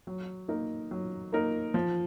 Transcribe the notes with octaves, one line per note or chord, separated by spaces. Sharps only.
F#3
A#3 D#4 A#4
F#3
A#3 D#4 A#4
F3